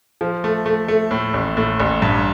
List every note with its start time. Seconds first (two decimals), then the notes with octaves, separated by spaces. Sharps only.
0.21 F3
0.44 A3
0.66 A3
0.88 A3
1.11 A2
1.34 A1
1.57 A2
1.80 A1
2.02 G2